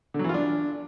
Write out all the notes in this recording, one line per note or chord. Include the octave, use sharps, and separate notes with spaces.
D3
F#3
E3
F4
D4